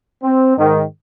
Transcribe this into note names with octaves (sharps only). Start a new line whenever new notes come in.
C4
G#2 D#3